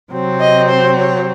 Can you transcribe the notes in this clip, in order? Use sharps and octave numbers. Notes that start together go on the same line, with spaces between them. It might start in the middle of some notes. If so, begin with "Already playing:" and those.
C3 F#3 C4
D#5
C5
C#5